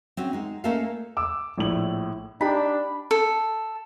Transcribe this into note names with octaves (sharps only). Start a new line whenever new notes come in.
C4 C#4 F#4
G#3 D#4
A3 A#3 C#4 A4 D#5 F5
D6 E6
A#1 A2 E4 F#7
D4 D#4 G4 B5
A4